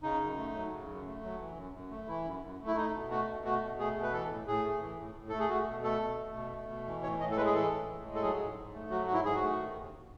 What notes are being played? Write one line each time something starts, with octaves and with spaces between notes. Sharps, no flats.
C#3 D#4
F#2
A3
F#3
C#3
F#2
A3
F#3
E3
F#2
F#2
A3
E3 E4
F#2
F#2
A3
E4
A3 D#4
B2
A3 F#4
B2
A3 F#4
B2
A3 G#4
B2
B4
E3 A4
A2
A2 G#4
A3
E3
A2
A2
A3 A4
G#4
A3 F#4
B2
A3 A4
B2
A3
B2
A3
B2
E3
A2 C#5
A2 D#5
A4
G#3 B4
G#4
E3 A4
A2
A2
G#3
A4
F#3 G#4
G#2
G#2
A3
F#3 F#4
G#2 F#4
E4
G#2 G#4
F#4
A3
D#3
D#2